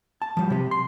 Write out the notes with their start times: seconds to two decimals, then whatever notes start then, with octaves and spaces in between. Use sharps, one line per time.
0.22 A5
0.37 F3 G3
0.50 C3 G4
0.71 C6